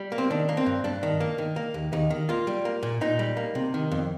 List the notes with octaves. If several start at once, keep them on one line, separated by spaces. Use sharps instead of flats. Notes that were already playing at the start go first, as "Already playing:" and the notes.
Already playing: G3
A#3
C4
D#3 D4
A#3
C4
G2
G2 D4
D#3
A#3
D#3
A#3
D#2
D#2 D#4
D#3
A#3 F4
G3
A#3
A#2
A#2 D#4
G3
A#3
C3
D#3
F2